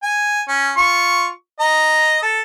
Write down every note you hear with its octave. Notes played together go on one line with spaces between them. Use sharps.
G#5
C#4
F4 C#6
D#5 A#5
A4